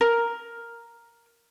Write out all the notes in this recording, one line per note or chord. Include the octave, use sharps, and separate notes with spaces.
A#4